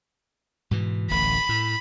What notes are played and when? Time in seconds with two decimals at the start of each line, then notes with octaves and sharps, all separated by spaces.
0.71 G#2 B2 E3
1.11 D1 A1 B5
1.49 A2